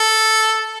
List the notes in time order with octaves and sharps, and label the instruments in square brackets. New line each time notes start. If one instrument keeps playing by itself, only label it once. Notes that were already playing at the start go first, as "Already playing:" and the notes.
Already playing: [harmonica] A4